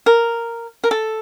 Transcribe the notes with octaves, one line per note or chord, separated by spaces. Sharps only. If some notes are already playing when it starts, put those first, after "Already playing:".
A#4
A#4
A4